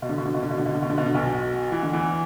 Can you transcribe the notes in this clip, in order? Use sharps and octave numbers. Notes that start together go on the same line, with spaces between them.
B2
D3
B2
D3
B2
D3
B2
D3
B2
D3
B2
D3
B2
D3
B1 B2
E3
D3
E2 E3